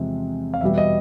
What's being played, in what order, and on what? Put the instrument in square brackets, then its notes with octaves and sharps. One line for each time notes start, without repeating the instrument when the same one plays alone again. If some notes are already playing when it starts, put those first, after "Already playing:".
Already playing: [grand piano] E2 C3 F3 G#3 C4
F5
E2 B2 G3 E5
D#5